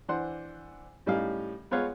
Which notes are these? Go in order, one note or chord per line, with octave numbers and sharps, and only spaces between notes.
E3 D4 C5 F#5 C6
A2 G3 C#4 D#4 F5
G#3 B3 F4 C#5 F5 F#5